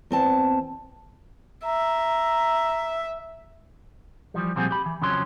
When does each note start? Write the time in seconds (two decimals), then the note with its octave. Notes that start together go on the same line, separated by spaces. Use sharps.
0.11 E2 C4 A5
1.66 E5 A#5
4.34 E3 F3 G3
4.56 A#2 F3 G3 C4 F#4 G#4
4.71 G4 B5
4.86 E3
5.01 F2 C#3 F3 F#3 C#4 C6